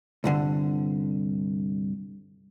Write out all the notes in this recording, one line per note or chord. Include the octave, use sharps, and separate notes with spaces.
C2 G2 D3